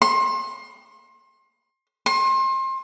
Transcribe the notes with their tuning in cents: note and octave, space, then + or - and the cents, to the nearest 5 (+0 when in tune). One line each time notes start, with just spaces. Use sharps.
C6 +30
C6 +30